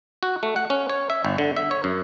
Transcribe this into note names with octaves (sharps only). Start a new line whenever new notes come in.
F#4
A3
F#5
C#4
C#5
E5
G1
D3
E5
C#5
F#2